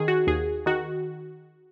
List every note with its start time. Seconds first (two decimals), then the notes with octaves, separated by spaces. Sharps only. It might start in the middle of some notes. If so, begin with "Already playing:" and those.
Already playing: D#3 G#4
0.08 F#4
0.27 D#2 G#4
0.66 D#3 F#4